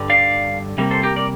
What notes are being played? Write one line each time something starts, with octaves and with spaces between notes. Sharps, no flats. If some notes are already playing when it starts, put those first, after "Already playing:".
Already playing: G2 D3 G3
D5 F5
C3 G3 A#3
A4 C5
G4 A#4
A#4 D5